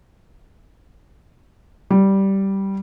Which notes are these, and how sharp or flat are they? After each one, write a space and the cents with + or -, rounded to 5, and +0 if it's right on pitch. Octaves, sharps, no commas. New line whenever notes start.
G3 -10